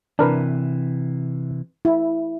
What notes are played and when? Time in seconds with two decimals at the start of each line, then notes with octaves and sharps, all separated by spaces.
0.19 C3 E3 D4 A#4 B4
1.85 E4